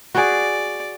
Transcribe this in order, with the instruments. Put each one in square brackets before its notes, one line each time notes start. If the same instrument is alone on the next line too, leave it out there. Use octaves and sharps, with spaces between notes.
[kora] F#4 G#4 [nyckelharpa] D5